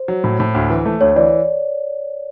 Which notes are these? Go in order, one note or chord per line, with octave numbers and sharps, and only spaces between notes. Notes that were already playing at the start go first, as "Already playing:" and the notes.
Already playing: C5
F#3
A2
A2
D2
E3
A3
D2 C#5
E3 D5